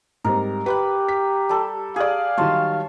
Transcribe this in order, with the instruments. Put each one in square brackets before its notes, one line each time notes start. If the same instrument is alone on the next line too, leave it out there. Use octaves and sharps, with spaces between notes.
[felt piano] G#2 G3 C4 [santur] A#4
[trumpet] G4 [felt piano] B4 B5 F#6
[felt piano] B6
[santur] G3 A4
[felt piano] G4 D5 [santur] G#4 [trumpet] F5
[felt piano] D#3 F#3 G3 [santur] C#5 A5 C6